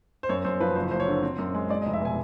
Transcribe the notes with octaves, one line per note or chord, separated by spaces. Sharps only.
C5
F#2 C#5
F#2 C5
F3 B4
F#1 C5
F#1 C5
C#5
D3
C4
F#2
G#3
G#3 D5
D#5
F1
E5
B2 G#5